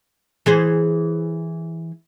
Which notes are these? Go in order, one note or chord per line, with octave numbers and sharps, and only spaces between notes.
E3 G#4 C5